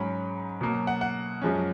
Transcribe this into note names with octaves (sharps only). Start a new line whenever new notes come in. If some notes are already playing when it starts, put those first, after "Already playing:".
Already playing: G#2 F#3 C#4 B5
B2 F#3 A#3
F#5
F#5
F#2 F3 G#3 C#4